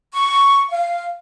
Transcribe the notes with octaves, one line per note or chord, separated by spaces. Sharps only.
C#6
F5